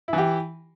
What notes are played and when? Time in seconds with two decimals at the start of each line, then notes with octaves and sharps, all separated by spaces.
0.08 E4
0.13 E3
0.18 G4